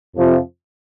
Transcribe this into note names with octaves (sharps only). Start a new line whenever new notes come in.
F2 C3 F3